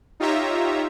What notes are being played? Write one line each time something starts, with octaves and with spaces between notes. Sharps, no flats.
D#4 F4 G4 C#5 E5 A#5